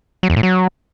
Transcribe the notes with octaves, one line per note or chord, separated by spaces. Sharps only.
F#3
E2
A2
F#3